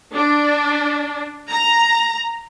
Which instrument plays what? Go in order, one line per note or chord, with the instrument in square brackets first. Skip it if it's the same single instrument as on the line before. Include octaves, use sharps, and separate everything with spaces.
[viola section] D4
A#5